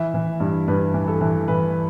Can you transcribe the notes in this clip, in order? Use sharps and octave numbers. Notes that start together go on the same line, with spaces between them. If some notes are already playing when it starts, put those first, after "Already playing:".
Already playing: E3 E5
E3
G2
G2 B4
E3
A4
E3
E3 B4